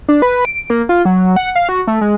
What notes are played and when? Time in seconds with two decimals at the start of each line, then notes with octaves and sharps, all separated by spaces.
0.08 D4
0.22 B4
0.45 D7
0.70 A#3
0.89 F4
1.05 F#3
1.36 F#5
1.56 F5
1.69 F#4
1.87 A3
2.01 G#3